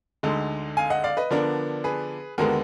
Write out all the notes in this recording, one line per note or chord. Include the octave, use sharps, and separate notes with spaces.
D2 D3 G#3 D#4
F5 G#5
D#5 F#5
D5 F5
B4 D#5
D3 F3 B3 D4 A#4 D5
G#4 B4
D#2 D3 G#3 B3 F#4 A#4